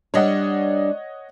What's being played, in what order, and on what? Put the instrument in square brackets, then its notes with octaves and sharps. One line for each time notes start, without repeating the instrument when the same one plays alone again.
[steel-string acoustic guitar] G3 D4 [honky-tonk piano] C#5 D#5 F#5